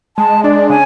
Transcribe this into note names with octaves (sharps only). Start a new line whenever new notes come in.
G#3 A5
D4 D5
C#3 G#5